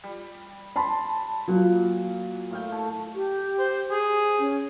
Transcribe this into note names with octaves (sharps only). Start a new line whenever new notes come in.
G3
A5 B5 C6
A#2 F#3 F#5
A2 F5 G5
A4 C#5
G4
C5
G#4
C#4